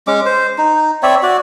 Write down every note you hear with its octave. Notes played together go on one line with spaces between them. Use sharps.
G#3 C#4 D6
C5
D#4
C4 C#5 D5 E5
F#4 D5